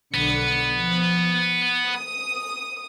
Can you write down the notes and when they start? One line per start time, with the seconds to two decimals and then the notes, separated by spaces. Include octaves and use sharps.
0.14 B1 D3 B3 C#7
0.73 F3
1.88 D#6